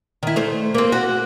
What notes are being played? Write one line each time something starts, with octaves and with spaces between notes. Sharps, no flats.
D#3 E4
A3 C5
A#3 C4
F#4